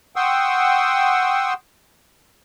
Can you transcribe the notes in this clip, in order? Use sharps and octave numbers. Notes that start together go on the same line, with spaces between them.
F#5 G5 C6 C#6 D#6 E6